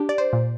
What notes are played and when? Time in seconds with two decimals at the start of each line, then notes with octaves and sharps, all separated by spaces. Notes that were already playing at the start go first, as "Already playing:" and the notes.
Already playing: D4 G4
0.09 D5
0.18 C5
0.33 A#2